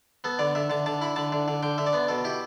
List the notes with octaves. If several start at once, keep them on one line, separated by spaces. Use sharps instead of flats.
B3 A4
D3 D5
D3 E5
D3 A5
D3 A5
E4 B5
D3 A5
D3
D3
D3 G5
D3 E5
D5
B3
B2 A4
E4 G4